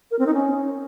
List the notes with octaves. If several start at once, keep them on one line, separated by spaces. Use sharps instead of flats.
A#4
C4
D#4
C#4